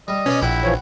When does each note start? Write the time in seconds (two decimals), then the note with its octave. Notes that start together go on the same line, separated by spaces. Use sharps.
0.08 G3 D#5
0.26 B2 C#4 D5
0.42 A#1 E4 F#5 G5 B5
0.64 E3 F3 C#5